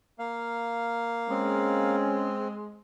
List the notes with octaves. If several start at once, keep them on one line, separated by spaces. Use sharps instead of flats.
A#3 F5
G#3 C4 C#4